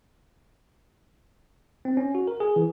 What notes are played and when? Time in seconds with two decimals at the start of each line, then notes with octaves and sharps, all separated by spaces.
1.85 C4
1.97 C#4
2.15 F#4
2.27 A#4
2.40 G#4
2.56 E3